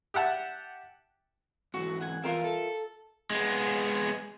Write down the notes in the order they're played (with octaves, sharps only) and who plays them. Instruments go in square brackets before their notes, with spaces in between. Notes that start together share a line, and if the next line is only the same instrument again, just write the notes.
[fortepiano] G4 E5 F#5 A5
[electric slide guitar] G#2 E3 F#3 [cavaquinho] F#4
[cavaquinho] F#5 G#5
[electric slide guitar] G2 E3 C5 [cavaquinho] F4 A#4 E5
[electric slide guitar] A4
[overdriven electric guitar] G#3 B3